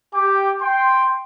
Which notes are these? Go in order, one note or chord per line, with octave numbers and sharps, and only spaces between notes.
G4 G5 D6
G5 C6